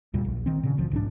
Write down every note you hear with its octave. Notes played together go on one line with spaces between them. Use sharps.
D2 A#2 G3
A#1
D#3 C4
A#2 C#3
G1 D2 F3
B1 G#2 D3 D4